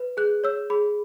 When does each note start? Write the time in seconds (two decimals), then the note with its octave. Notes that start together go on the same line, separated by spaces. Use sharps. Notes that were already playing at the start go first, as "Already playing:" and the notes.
Already playing: B4
0.17 G#4 F#6
0.44 C#5 E6
0.70 G#4 B5